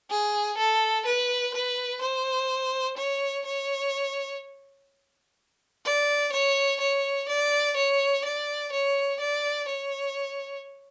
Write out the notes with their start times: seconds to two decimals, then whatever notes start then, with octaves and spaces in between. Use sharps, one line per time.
0.10 G#4
0.58 A4
1.06 B4
1.54 B4
2.02 C5
2.98 C#5
3.46 C#5
5.85 D5
6.33 C#5
6.81 C#5
7.29 D5
7.77 C#5
8.25 D5
8.73 C#5
9.20 D5
9.69 C#5